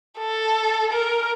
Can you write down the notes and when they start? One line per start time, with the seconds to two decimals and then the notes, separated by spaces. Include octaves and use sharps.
0.18 A4
0.92 A#4